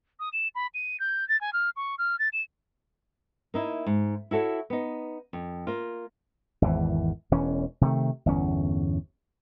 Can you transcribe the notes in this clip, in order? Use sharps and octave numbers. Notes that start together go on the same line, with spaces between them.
D#6
E7
B5
D#7
G6
A6
G#5
F6
C#6
F6
A6
E7
A#3 D#4 E4
G#2
E4 F#4 A4 C#5
B3 D#4
F2
A#3 F4
G#1 E2 E3
E1 E3 C#4
C3 D#3 A3
G1 E2 C#4